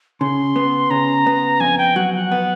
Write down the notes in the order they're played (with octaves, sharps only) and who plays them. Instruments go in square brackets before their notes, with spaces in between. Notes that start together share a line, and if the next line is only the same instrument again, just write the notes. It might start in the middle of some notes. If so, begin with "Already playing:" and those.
[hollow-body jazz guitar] C#3 [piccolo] C6
[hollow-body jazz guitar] B3
[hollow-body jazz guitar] C#3 [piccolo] A#5
[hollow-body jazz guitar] B3
[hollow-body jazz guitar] F2 [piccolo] G#5
[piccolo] G5
[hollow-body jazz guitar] F#3 [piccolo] F#5
[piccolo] F#5
[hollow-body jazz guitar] B3